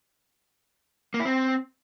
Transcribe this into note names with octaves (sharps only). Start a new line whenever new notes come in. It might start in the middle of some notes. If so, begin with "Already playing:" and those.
A#3
E4
C4